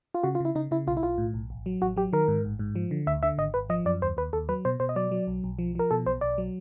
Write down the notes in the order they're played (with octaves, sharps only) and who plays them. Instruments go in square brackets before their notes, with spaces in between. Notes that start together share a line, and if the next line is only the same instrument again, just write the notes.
[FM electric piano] F4
C#3 F#4
F4
C#3 E4
C#3 D#4
C#3 E4
B1 F4
E4
B1 F4
A2
B1
A1
F#3
A1 F#4
F#3 G4
D#3 A#4
G#2
A1
G#2
F3
D3
D2 E5
D3 E5
G#1 D#5
G#1 B4
F3 D#5
F#2 D5
D#2 C5
D#2 B4
D#2 A4
F#3 B4
B2 C5
B2 C5
D#5
F#3 D5
F#3
B1
B1
F3
F3 A#4
B2 A4
B1 C5
B1 D5
F#3